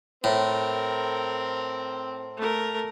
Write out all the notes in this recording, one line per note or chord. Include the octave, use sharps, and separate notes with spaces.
A2 C4 A4 A#4
A3 A#4